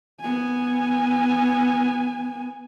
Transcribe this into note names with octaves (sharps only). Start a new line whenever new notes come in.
B3 G#5